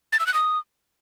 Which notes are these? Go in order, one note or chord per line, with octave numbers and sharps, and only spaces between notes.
A6
E6
F#6
D#6